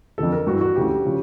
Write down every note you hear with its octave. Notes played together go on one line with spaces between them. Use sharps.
F2 D3 F3 A4
A#4
G2 E3 F#4
F#4
D2 C#3 E3 G4
C#3 F3